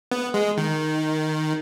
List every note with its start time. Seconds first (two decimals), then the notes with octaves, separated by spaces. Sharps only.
0.11 B3
0.34 G#3
0.57 D#3